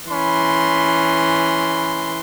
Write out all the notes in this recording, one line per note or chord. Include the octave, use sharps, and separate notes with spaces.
E3 C#4 B5 C6